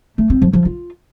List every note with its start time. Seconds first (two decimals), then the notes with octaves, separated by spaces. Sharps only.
0.18 A3
0.30 C4
0.42 F3
0.53 F3
0.65 F4